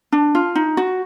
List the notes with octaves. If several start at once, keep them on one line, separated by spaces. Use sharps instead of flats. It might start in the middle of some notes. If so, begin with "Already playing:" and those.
D4
F4
D#4
F#4